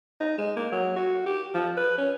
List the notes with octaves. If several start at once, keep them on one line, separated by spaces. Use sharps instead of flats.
D#4
G#3
A#3
F#3
F#4
G4
F3
B4
C#4